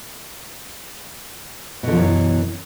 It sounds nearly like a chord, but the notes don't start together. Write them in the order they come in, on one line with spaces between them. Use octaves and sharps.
B2 D3 F3 F#2 E3